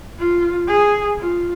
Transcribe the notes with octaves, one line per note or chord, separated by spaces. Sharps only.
F4
G#4
F4